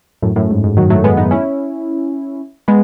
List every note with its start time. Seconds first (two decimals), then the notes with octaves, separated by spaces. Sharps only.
0.22 F#2 A2
0.36 F#2 A2
0.50 G#2
0.64 G#2
0.77 D#3 F#3
0.90 F#3 A3
1.04 G#3 B3
1.17 B3 D#4
1.31 C#4 E4
2.68 G#3 B3